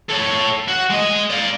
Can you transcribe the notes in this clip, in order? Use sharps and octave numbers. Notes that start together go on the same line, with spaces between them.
A4 C#5
F#4
G#3 D#5
D5 F5